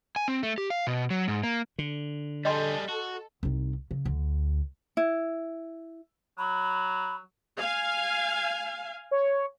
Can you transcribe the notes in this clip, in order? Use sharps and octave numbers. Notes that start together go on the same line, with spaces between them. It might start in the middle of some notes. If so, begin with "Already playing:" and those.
G#5
C4
A3
G4
F5
B2
F#3
G#2
A#3
D3
G3 G#4 A4 D#5 G5 C6
F#4
C2 D#4
C#3
D2
E4
F#3 B5
F5 G#5
C#5